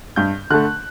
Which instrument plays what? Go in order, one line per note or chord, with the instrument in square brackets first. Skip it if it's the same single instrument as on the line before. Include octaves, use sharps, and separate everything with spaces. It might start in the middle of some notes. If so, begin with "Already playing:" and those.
[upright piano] G2 G6
D3 A3 F#6